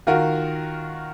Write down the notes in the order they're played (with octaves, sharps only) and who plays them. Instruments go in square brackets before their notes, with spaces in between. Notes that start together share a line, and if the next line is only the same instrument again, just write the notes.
[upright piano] D#3 F4 F#4 A#4